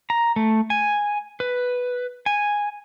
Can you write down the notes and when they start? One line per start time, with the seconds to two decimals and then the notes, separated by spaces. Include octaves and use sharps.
0.10 A#5
0.36 A3
0.70 G#5
1.40 B4
2.26 G#5